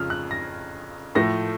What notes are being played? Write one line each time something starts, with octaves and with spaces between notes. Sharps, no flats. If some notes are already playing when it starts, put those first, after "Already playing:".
Already playing: F2 C#3 F3 F6
F#6
A#6
A2 F3 A3 A#6